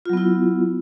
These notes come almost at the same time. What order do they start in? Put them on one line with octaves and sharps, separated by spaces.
F4 F#3 B3 E4